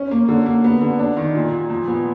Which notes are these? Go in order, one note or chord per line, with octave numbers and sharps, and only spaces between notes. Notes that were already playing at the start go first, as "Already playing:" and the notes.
Already playing: C#4
A#3
D3
A#3
B3
D3
D4
D#3
A#2
A#2
F3
B3